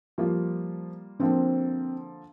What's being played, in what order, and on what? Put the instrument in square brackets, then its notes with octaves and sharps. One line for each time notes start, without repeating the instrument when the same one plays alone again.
[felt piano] F3 [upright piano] G3 A#3 F4
[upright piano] D3 F3 A#3 [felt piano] C4